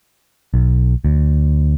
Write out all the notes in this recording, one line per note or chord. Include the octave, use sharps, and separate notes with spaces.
B1
D2